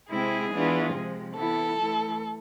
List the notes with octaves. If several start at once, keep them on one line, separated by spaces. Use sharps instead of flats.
C3 G#3 C4 E4 G#4
E3 B3 D4 F4
C3 F3 G#3
E3 B3 E4 A4
E3 A3 E4